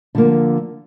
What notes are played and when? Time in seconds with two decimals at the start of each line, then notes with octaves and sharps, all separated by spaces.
0.15 D3 F3 A#3